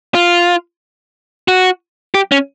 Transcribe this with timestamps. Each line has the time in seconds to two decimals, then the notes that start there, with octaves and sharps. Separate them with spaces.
0.14 F4
1.48 F#4
2.15 G4
2.32 C#4